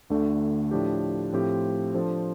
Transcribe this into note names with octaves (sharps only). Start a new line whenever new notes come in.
D2 D3 A3 D4
A2 F3 D4 G4
A2 F3 C4 G4
F3 D4 A4 C5